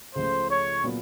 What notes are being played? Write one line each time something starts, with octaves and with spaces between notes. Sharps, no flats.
C#2 C#3 F3 A3 C5
C#5
A#2 F#3 B3